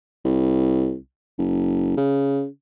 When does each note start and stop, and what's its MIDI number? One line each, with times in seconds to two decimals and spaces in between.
0.25 0.96 36
1.38 1.95 30
1.97 2.46 49